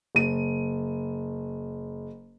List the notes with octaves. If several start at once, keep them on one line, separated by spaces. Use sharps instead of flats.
F#1 D#7